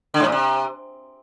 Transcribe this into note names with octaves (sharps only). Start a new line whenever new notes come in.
D3
G#2
A#2
C3